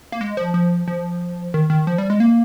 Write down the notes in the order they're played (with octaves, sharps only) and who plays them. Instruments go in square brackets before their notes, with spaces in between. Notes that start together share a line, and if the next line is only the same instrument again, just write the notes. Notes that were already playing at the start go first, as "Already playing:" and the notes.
[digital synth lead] A#3
G#3
F3
F3
F3
D#3
D#3
F3
G3
G#3
A#3